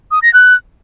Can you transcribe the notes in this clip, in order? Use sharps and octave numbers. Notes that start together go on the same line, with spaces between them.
D#6
A#6
F#6